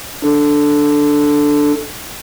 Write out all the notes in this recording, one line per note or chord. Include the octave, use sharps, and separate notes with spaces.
D4 A4